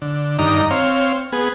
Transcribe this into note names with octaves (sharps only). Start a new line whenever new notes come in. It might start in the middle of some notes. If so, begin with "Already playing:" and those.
D3
G2 D#3 D#4 D5 A#5
C4 C#5 F5
B3 G#4